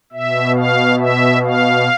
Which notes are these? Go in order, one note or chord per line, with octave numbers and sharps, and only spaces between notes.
B2 E5
F5
E5
F5